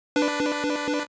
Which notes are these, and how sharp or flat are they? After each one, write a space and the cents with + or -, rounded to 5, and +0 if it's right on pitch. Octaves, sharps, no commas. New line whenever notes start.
D4 +0 B4 +5